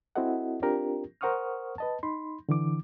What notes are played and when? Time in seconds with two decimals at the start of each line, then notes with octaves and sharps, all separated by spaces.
0.16 C4 E4 F#4 A4 D#5 F#5
0.62 C4 D4 F4 G4 A#4
1.21 A#4 C5 F#5 C#6 D#6 F6
1.78 B4 D#5 A5
2.03 D#4 B5 C6
2.49 D3 E3 D6